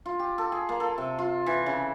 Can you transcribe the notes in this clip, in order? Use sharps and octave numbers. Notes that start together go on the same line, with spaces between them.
F4
G4
A4
G#4
A#3
A4
C3
F4
E3
C#3